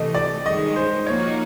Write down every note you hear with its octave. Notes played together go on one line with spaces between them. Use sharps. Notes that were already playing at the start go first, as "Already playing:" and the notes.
Already playing: C3 E3 A3 D#5
D5
G2 D#3 G#3 C#4 D#5
C5
A#2 F3 A#3 D#4 F#4 C#5